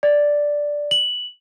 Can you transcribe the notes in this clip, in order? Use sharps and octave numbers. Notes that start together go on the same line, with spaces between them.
D5
F#7